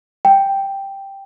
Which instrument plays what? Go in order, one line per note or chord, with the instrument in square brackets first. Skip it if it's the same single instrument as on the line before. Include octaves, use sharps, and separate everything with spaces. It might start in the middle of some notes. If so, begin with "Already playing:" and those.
[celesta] G5